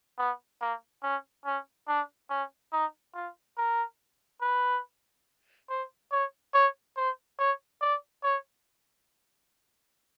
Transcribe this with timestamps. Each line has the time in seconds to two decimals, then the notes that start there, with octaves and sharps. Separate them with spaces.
0.18 B3
0.61 A#3
1.03 C#4
1.45 C#4
1.88 D4
2.30 C#4
2.72 D#4
3.15 F4
3.57 A#4
4.42 B4
5.70 C5
6.12 C#5
6.54 C#5
6.97 C5
7.39 C#5
7.82 D5
8.24 C#5